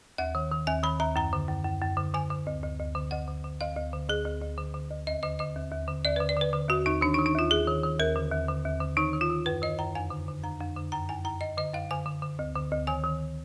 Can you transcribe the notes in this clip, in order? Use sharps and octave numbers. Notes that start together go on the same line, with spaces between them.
D#2 F#5
D#3
D#3
D#2 G#5
D#3 B5
D#2 A#5
F#2 A#5
D3
F#2
F#2
F#2
D3
D3 G#5
D3
D2
D2
D2
D3
D2 F#5
D3
D3
D2 F5
D2
D3
D2 G#4
D2
D2
D3
D3
D2
D#2 D#5
D3 D#5
D3 D#5
D#2
D#2
D3
D#2 D5
D3 B4
D5
D3 B4
D3
D#2 F#4
D#2 D#4
D#3 D4
D#4
D#3
D#4
D#2 F4
D#2 G#4
D#3
D#3
D#2 A#4
D3
D#2
D3
D#2
D3
D#3 D#4
D#3
F4
D#3
F#2 B4
D#3 D#5
F#2 A#5
F2 G#5
D3
D3
F2 A#5
F2
D3
F#2 A#5
F#2 G#5
F#2 A#5
F#2 D#5
D3 D#5
F#2 F5
D3 G#5
D3
D3
D2
D3
D2
D#3 G#5
D#3